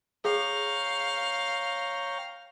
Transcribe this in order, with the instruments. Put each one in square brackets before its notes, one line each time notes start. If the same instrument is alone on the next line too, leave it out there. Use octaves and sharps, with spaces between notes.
[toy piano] G#4 [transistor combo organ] C#5 G5 A#5 [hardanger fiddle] F5